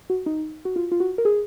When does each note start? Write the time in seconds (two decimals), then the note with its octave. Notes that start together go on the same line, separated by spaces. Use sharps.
0.10 F#4
0.26 D#4
0.65 F#4
0.76 F4
0.92 F4
1.00 F#4
1.18 A#4
1.25 G#4